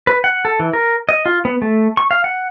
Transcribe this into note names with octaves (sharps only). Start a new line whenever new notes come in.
B4
F#5
A4
E3
A#4
D#5
F4
B3
A3
C#6
F5
F#5